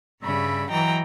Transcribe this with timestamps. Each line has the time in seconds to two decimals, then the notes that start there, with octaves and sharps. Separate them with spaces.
0.22 G2 C#3 G3 E5 B5
0.70 E3 F#3 D#5 G5 A#5 A#6